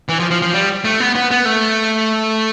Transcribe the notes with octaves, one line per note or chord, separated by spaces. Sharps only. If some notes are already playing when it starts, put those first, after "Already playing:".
E3
F3
F3
F3
G3
A3
B3
B3
B3
A3